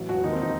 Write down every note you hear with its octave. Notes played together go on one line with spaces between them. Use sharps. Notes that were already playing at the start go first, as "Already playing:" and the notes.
Already playing: A1 F#3
E1 F#4
D#2 D#4
C4
D#4